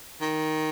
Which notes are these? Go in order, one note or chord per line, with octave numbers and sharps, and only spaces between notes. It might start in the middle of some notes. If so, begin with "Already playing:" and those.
D#3